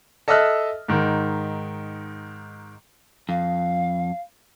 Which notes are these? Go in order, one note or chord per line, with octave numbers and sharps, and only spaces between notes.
A4 D#5 E5 A5 F6 F#6
G#2 D#3
F2 F5